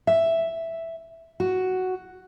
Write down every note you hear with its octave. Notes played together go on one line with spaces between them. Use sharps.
E5
F#4